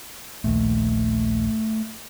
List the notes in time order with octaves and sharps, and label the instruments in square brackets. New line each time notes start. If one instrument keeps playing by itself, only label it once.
[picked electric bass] A#1 D#2 [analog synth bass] A3